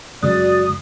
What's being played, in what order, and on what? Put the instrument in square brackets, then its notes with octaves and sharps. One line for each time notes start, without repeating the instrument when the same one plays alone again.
[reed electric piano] F#2 C#3 G#3 [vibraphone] F#4 [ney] D5 [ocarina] D#6